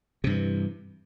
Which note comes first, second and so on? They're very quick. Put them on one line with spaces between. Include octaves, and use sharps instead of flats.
C3 G2 E3